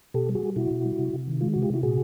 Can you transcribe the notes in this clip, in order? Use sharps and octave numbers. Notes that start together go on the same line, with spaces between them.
B2 G4 A4
G3
F#4 G#4
G3
B2 E4 F#4
B2
G3
C3
C3
D#3
G#3 F4
C3 F#4
F4 G4
C3 E4 F#4
A#2 F#4 G#4